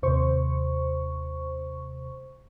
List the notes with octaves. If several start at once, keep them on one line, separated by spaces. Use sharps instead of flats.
D#2 C3 C5 C#6